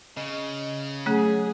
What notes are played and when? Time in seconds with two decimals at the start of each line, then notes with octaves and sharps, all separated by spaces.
0.17 C#3 D#5
1.06 F#3 A3 C#4 G#4 C#5